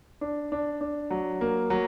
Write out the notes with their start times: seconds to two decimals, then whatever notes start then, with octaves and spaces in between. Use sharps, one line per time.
0.21 D4
0.52 D4
0.81 D4
1.10 F#3
1.41 A#3
1.70 F#3